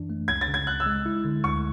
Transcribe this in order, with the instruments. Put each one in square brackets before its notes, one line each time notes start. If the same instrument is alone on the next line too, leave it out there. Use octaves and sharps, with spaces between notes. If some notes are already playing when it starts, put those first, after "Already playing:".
Already playing: [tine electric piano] F#2 E3 D4
A3
[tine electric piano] C#2 [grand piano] G#6
[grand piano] A6
[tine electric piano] C#3
[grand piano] G#6
[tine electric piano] C#2 [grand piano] F#6
[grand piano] E6
[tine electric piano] G#3
E4
D3
[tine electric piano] D2 [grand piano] C#6